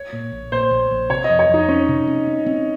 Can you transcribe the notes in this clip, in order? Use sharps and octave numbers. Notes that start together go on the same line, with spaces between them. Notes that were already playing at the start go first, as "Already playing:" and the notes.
Already playing: C#5
A#2
A#1
A#2 C5
A#1
A#1
C3 C#5
D#5
F2
C#5
F2 D#4
C4 C#4
C3
C4
C4
C4